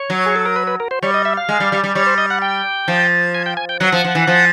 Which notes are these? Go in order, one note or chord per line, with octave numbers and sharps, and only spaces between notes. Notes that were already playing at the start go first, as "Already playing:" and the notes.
Already playing: C#5
F#3
G#4
A4
A#4
B4
B4
A#4
C5
G3 C#5
D#5
E5
F5
G#3
G3
G3
G3
G3 C#5
C5
D#5
F#5
G5
F3
G#5
G5
G#5
G5
F#3 F#5
F3
F3
E3
F3